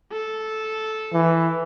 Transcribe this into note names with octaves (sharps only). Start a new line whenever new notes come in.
A4
E3